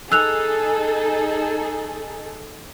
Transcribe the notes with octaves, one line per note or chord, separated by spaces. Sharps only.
D#4 G#4 A4 E6 F#6 F7